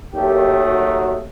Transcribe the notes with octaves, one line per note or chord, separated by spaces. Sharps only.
D#2 D#3 F#3 A3 G4
F#4